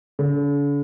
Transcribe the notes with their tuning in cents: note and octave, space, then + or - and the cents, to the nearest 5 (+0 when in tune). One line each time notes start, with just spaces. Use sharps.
D3 -45